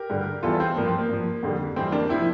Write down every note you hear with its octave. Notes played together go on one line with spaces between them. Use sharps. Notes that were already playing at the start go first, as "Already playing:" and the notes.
Already playing: G4 A#4
G2 D3 G3
E2 E3 G3 F4 A4
C4
G2 F3 A#3
C4
A#3
G2 F3
F2 D3 G3
F2 E3 G3 C4
A#3 D4
C3 F3 C4 E4